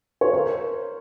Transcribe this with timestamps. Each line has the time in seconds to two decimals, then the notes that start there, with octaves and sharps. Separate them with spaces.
0.21 C#5
0.33 A#4 C5